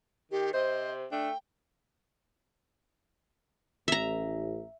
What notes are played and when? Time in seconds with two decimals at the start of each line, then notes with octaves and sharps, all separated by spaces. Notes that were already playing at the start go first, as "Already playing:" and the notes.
0.31 D#3 G4
0.54 C3 C5 D#5
1.12 A3 D4 G5
3.88 A1 E5 A#5